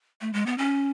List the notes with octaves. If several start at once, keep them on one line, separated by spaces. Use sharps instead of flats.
A3
G#3
B3
C#4